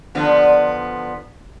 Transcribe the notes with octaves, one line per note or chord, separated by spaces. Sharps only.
D3 F3 B3